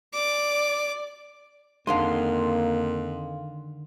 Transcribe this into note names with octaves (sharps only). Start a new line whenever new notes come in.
D5 D6
F2 D3 D#3 G#3 A#3 F5 C6